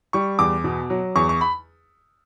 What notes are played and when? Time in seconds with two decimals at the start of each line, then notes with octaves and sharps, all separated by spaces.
0.13 G3 C#6
0.39 E2 D6
0.64 B2
0.90 F#3
1.15 E2 C#6
1.29 C#6
1.41 B5